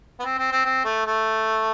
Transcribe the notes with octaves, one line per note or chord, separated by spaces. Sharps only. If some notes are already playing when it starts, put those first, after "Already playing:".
B3
C4
C4
C4
C4
A3
A3